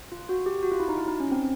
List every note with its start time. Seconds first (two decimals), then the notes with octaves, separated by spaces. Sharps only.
0.12 F4
0.29 F#4
0.46 G4
0.63 F#4
0.72 F4
0.80 E4
0.89 D#4
0.98 E4
1.08 D#4
1.20 C#4
1.32 C4